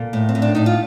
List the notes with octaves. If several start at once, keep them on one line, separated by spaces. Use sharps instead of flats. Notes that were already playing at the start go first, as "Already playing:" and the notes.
Already playing: A#2 A4
A2
C4
A2
D4
A2 D#4
F4